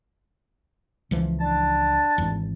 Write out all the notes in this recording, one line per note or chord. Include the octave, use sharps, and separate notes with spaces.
C#2 E3 F3
D4 A5
G#1 E2